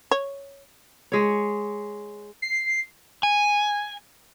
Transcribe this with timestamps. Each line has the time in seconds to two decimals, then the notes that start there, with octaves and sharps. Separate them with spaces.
0.11 C#5
1.12 G#3 C#5
2.42 C7
3.23 G#5